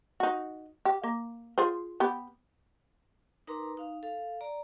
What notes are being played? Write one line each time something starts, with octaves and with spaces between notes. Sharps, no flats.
D#4 F#4
G4
A#3
F4 G#4 C5
B3 G4
D#4 A#4 B4 A#5 C6 D6
D#4 F5
A4 F5
D5 A#5